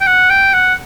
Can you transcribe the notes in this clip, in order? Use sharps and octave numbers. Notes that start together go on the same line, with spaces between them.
G5
F#5
G5
F#5